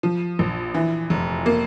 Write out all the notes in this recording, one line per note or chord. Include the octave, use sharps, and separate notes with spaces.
F3
A#1
E3
F1
A#3